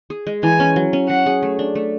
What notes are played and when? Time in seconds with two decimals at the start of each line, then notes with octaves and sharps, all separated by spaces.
0.10 G#4
0.27 G#3
0.43 E3 G#5
0.60 C#4
0.76 F#3
0.93 C#4
1.09 F#3 F#5
1.26 G#4
1.43 A3
1.59 D4
1.75 A3